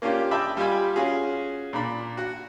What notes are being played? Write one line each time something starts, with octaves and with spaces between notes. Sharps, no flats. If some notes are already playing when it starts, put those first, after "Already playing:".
A#3 C#4 D4 F4 G4
D#5 E5 G5 A5 B5 D6
G3 F4 G4 G#5 B5
C#4 F4 F#4 G#4
A#2 D4 B5
F#4 F#5